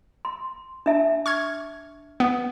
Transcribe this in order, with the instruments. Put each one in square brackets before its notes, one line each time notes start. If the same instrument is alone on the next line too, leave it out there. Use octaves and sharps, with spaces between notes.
[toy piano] C6
D4 E5 A5
[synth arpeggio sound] C#6 F6 G#6
B3